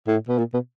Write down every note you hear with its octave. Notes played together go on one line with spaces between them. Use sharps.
A2
B2
A#2
B2